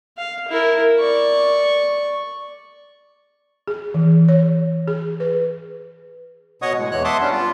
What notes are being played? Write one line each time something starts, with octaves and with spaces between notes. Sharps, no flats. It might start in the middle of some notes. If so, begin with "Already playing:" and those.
F5
E4 A#4
D5 C#6
G#4
E3
C#5
G#4
B4
B2 C#5 D#5 F#5 C#6 D#6
A2 G#3
E2 E3 C#5 F#6
E5 F#5 A5 C6 D6 D#6
G3 B3 C#4 D4
F4